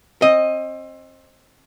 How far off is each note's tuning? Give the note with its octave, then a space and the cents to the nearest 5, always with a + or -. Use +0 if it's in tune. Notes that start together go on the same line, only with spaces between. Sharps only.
C4 +25 D#5 +0